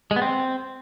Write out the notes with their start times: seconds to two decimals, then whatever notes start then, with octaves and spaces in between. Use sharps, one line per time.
0.11 G#3
0.16 B3
0.22 C4